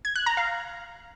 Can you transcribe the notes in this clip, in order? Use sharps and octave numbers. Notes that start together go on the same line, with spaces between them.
G#6
F#6
A#5
F5